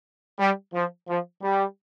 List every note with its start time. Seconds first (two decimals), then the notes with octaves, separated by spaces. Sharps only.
0.39 G3
0.74 F3
1.08 F3
1.43 G3